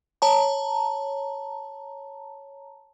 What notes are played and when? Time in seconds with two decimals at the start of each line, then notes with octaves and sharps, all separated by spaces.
0.22 C#5 A5 A#5